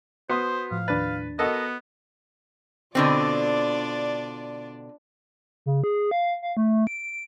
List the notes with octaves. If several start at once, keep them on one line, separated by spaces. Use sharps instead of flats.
B3 F#4 C5 C6 D#6
A2 F3 F5
D#2 D4 B4 A6
B3 F#4 A4 A#4 D#5
B2 D3 C4 D4 F4 D5
C#3
G#4
F5
F5
A3
D7